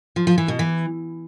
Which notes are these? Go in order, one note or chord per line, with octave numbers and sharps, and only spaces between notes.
F3
F3
E3
B2
E3